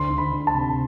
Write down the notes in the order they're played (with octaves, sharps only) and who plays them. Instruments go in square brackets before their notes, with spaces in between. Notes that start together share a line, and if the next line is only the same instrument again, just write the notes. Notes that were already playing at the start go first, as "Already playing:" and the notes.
Already playing: [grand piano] D2 C6
D2
B5
D2
A5
C3